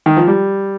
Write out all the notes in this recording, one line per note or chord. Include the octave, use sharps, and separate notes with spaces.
D#3
F3
G3